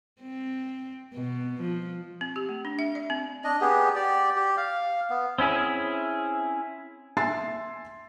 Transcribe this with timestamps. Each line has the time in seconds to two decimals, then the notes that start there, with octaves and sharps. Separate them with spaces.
0.21 C4
1.14 B2
1.61 F3
2.21 C4
2.36 G4
2.49 A3
2.65 D4
2.79 E5
2.95 D5
3.10 C4
3.44 D4 D#5
3.61 B3 G4 G#4
3.96 G4 D5
4.36 G4
4.57 F5
5.10 B3
5.38 C4 C#4 E4 G#4
7.17 E5 G#5 C6 E6 A6 C7